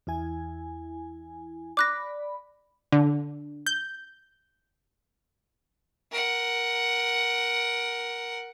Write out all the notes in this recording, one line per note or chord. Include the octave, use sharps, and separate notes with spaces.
E2 E4 G#5
D5 B5 D6 F#6 A#6
D3
G6
A#4 F#5